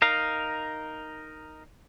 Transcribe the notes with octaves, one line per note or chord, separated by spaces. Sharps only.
D#4 A#4 F5